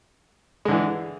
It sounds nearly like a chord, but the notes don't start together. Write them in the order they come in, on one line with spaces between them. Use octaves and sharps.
G#3 D3 E3